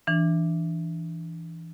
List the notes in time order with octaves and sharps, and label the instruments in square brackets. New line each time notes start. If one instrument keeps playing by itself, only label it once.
[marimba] E3 D4